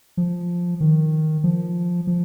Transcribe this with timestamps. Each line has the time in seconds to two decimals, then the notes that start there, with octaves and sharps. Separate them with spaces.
0.17 F3
0.81 D#3
1.44 F3
2.07 F3